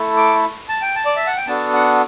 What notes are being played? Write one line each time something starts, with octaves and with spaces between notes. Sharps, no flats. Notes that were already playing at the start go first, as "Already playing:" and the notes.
Already playing: A3 E4 A4
D6
A5
G5
A5
D5
E5
F#5
G5
B3 D4 F#4 A4 A5
F#5